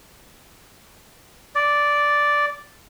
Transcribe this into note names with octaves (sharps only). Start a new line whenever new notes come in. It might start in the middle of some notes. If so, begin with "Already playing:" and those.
D5